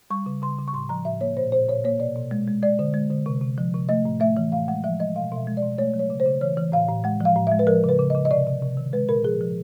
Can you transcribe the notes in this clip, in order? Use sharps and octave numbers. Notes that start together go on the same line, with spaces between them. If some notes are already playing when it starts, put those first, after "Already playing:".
G3 C#6
C#3
C#3 C6
C#3
C#6
A2 C6
F3 A#5
A2 E5
A#3 C#5
A#2 C5
A#2 C5
A#2 C#5
A#3 C#5
B2 D5
B2
G#3
G#3
G#3 D5
D3
G#3
D3
C3
C3
F3
C3
A3 D#5
A2
A3 E5
E3
A2 F5
G#3 F#5
F3 E5
G#3 D#5
B2 F5
B2 E5
G#3
D5
B2
A3 C#5
F#3
C#5
C#3
C5
C#3
E3 C#5
E3
A2 F5
A2
G#3 F#5
F3 F5
A2
E5
G#3
B4
F3 A#4
C#3 B4
C#3
D#5
C#3
D#5
C3 D5
C3
C3
D#3
G#3 B4
A#2 A#4
F3 G#4
F3